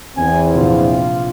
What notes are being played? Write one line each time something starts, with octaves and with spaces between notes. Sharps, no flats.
E2 C4 G#5
A#1 C3 F4